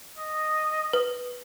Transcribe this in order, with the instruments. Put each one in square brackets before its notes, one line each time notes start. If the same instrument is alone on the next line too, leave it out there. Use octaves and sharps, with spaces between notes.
[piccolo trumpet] D#5
[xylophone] B4